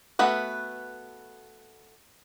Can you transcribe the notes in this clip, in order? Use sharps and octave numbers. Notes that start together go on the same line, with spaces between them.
A3 B3 F#4 B4